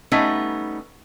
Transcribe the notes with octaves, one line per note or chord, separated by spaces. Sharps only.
G3 A3 B3 C#4 D#4